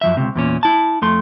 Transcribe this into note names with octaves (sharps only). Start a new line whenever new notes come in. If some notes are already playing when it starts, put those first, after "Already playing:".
F#2 F3 E5
C#2 C3
E2 A#2 C#4
E4 A5
F2 A3 C6